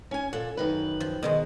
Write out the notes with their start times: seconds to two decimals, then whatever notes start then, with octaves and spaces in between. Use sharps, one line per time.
0.11 C#4 G#5
0.33 A#2 A4 F#5
0.57 F#2 D#3 B4
1.00 F3
1.23 B2 D#3 G#3